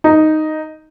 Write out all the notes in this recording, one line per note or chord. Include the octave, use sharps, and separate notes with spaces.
D#4